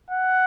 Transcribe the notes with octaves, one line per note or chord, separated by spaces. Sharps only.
F#5